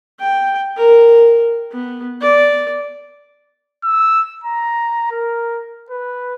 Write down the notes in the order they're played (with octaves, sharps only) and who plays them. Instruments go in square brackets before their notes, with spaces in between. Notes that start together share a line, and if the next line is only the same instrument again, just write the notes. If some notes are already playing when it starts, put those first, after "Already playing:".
[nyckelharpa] G5
A#4
B3
D5
[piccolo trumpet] E6
A#5
A#4
B4